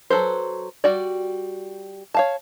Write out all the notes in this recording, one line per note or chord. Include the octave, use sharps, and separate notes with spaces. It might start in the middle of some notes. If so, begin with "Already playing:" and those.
F#3 A4 B4 C5
G3 F#4 D5
C#5 F5 A5